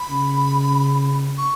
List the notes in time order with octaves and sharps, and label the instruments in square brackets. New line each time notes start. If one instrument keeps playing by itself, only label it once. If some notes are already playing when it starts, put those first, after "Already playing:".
Already playing: [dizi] B5
[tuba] C#3
[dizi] C#6